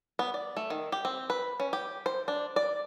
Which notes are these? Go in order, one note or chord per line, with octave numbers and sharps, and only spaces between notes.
B3
D5
A3
D#3
G4
C4
B4
C#4
G4
C5
D4
D5